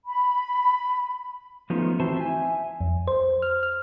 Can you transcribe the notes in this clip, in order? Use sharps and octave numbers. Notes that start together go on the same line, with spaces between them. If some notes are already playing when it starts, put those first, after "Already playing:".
B5
F3 A3 B3 C#4 D#4 F4
E3 C4 E4 F#4 C5 A5
E5 G#5
F2
C5
F6
F6